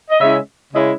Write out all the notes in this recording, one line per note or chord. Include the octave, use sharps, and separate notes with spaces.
D#5
C#3 G#3 C#4 E4 E5
C#3 G#3 C#4 E4 D#5